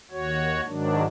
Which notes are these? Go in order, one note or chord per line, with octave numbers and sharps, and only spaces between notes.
D#2 F#4 C#5
G#2 D#3 F#3 D4